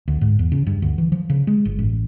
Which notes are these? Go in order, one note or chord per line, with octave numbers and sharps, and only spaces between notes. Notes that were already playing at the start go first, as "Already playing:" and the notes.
D2
G#2
E2
C#3
G2
D2
E3
F3
C#3
G#3
G1
A1